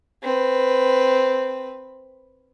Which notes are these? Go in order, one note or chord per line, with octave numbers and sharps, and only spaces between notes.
C4 B4